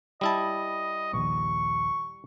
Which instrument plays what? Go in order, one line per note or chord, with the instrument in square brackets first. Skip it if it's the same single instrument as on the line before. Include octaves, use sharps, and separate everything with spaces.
[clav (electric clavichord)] G3 E4 A5 [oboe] D#5
[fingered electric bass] A#1 D#2 [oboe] C#6